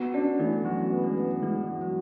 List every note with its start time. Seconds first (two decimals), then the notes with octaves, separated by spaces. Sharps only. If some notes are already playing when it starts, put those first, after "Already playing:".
Already playing: B3 F#4
0.14 C#4 D4
0.39 E3 A3
0.65 F#3 F#4
0.90 B3
1.04 G#3
1.17 B3
1.42 E3 G#3
1.68 F#4
1.81 F#3